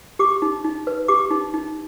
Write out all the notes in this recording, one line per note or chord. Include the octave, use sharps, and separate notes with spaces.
G4 D6
D#4
D#4
B4
G4 D6
D#4
D#4